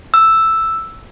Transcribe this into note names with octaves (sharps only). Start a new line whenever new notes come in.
E6